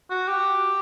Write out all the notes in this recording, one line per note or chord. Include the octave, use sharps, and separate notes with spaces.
F#4
G4